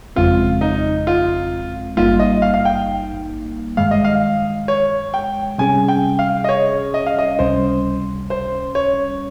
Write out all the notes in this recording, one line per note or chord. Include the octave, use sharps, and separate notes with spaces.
G1 F2 C#3 G#3 C4 F4
D#4
F4
G#1 G2 G3 A#3 D#4 F4
D#5
F5
F5
G5
G2 D#3 G#3 F5
D#5
F5
C#5
G5
C3 G3 C#4 G#4 G#5
G5
F5
D#5
C#5
D#5
F5
D#5
C#2 C3 G3 C#4 C5
C5
C#5